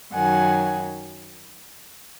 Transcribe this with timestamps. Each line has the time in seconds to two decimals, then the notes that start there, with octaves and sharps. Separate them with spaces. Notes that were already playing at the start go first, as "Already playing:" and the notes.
0.15 F#2 D#3 F#3 F#5 G#5